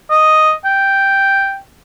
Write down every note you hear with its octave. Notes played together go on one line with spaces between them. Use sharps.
D#5
G5